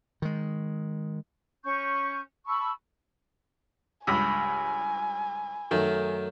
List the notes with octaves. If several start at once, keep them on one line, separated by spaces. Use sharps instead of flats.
D#3 G#3
C#4 C#6 G6
A5 B5 C#6 E6
C#2 G2 G#5 B5 E6
F#2 D#3 F#3 A3